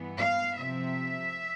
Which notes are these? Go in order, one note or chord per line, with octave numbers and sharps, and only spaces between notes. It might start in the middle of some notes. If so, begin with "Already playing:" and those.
Already playing: G2 E3 B3
F5
C3 F3 C4 E5